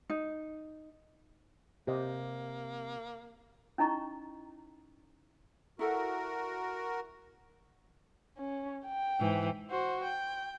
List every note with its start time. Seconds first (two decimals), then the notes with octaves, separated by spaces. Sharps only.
0.10 D#4
1.87 C3 A#3 G4 C5 D#5
3.78 C#4 D#4 E4 D#5 A#5 C#6
5.79 E4 F#4 A4 A#4 F#5
8.38 C#4
8.86 G5
9.20 G#2 E3
9.70 F#4 C5
10.04 G5